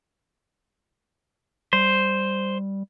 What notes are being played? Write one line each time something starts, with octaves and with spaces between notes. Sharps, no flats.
G3 C5